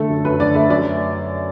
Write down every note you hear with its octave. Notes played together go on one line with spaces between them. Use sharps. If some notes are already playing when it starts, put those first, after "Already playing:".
Already playing: D3 A3 A4
F#2
F#2 B4
D3 D5
A3 E5
F#2 D5